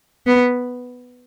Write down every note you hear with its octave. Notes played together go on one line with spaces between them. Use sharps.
B3